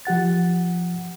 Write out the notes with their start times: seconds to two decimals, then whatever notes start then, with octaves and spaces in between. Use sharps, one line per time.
0.05 F3 G4 F#5 A6